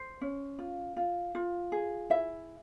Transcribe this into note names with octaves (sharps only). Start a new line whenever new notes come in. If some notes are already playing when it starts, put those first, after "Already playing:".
Already playing: C5
C#4
F4
F4
F4
G#4
E4 E5